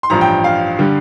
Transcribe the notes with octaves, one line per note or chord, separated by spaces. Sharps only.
C6
A1 G2 F3 A#5
G5
F5
D3 G3